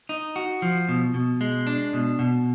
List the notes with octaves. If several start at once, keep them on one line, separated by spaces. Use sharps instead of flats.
D#4
F#4
F3
B2
B2
G#3
D4
B2
B2